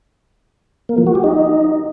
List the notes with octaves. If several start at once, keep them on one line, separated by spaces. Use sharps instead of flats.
A#3
F3
F#4
G4
D#4